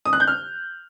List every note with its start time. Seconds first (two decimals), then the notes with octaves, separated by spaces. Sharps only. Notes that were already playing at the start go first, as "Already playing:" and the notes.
0.05 D#6
0.13 F#6
0.20 G6
0.27 F6